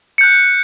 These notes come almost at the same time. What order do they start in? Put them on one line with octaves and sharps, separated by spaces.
C#7 G6 F#6